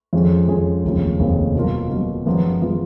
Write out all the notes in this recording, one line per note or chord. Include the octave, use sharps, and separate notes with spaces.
F2 F3 G#3 C#4 G#4
F2 F3 G#3 C#4 G#4
F1 D#2 C#3 F3
F1 D#2 C#3 F3
B2 F#3 A#3 F4 A#4
B2 F#3 A#3 F4 A#4
F#2 F3 G#3 B3 F4
F3 G#3 B3 F4